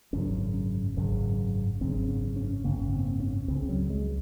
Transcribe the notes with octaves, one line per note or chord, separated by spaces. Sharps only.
G#1 F#2 C#3 C#4
G#1 F#2 C#3
G#1 F#2 C#3 C4
C#4
C#4
G#1 F#2 C#3 A#3
C4
C#4
C#2 C#3 C4
F#3
G#3